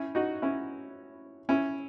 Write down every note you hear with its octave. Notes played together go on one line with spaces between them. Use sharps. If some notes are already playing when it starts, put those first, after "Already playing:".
Already playing: C#4 E4
D#4 F#4
C#4 E4
C#4 E4